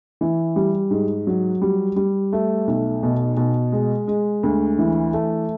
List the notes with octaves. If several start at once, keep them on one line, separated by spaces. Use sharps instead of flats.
E3
G3
G#2
F#3
G3
G3
A3
B1
B2
B2
G#3
G#3
D2
E3
A3